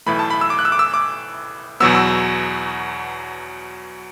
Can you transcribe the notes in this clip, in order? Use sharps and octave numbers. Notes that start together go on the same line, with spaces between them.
B1 A2 E3 A3 B5
A5
B5
E6
D6
F#6
E6
D6
E6
D6
E2 B2 F#3 B3 E6
E6